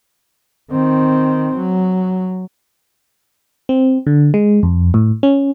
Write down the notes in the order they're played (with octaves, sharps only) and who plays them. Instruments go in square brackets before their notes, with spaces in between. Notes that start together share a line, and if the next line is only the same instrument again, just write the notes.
[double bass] D#3 C4
F#3
[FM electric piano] C4
D3
G#3
F2
A2
C#4